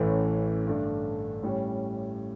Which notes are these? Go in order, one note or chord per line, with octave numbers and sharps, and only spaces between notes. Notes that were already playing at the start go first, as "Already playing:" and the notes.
Already playing: A1 A2 E3 A3 C#4
G2 D3 A3 D4
A2 G3 C#4